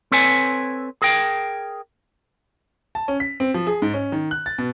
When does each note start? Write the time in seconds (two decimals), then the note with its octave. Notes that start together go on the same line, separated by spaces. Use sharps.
0.12 C4 A4 B4 C#5 G#5
1.02 G#4 A#4 G5
2.95 A5
3.08 C#4
3.20 B6
3.40 C4
3.54 F3
3.67 G#4
3.82 G#2
3.94 C#4
4.12 D#3
4.31 F#6
4.46 A6
4.59 B2